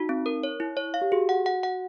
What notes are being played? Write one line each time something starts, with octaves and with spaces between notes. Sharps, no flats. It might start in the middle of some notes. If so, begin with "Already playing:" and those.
Already playing: D#4 F#4
C4
A#4
C#5
E4
C#5
F5
G4
F#4 G#4
F#5
F#5
F#5